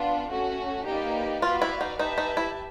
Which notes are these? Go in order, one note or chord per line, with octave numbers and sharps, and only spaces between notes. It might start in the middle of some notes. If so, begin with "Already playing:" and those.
Already playing: B3 D4 F4
A3 C#4 F#4
A#3 D#4 G4 B4 D5
F4 F#4 B4 D5 F5
E4
D#4
D#4 G4 B4 E5 A5
D#4
E4